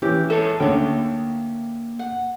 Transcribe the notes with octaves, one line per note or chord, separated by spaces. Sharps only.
E3 C#4 G4
G#2 A4 C#5 E5
D2 D3 A#3 C#4 G5
F#5